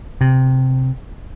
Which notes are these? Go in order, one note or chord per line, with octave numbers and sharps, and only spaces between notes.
C3